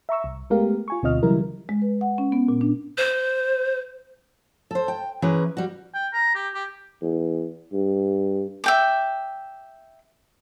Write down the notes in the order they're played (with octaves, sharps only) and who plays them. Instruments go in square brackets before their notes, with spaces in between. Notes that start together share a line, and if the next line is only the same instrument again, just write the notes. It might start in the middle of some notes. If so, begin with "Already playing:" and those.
[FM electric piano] E5 A#5 C#6 E6
C2
G#3 A3 B3 G4 A#4 F5
F4 G#5 C#6
D2 B2 C4 F4 D#5 F6
C#3 E3 F#3 G3 E4 A#4
[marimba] G#3
B4
F#5
C#4
B3
A#2
D4
[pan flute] C5
[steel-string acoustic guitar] A4 C5
G5
E3 A#3 C#4 G#4 B4
G3 F#4
[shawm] G5
A#5
G4
G4
[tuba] E2
G2
[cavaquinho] E5 G5 D6